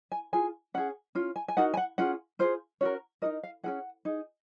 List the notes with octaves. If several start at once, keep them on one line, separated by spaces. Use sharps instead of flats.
G#5
F4 G#4 G#5
C#4 G#4 F#5
C#4 F4
G#5
G#5
D#4 F#4 A#4 F#5
G#5
F#5
C#4 F4 G#4 F#5
F4 G#4 C5
C#4 F#4 A#4 C#5
D#4 F#4 A#4 D#5
F5
C#4 F4 G#4 F#5
D#4 G#4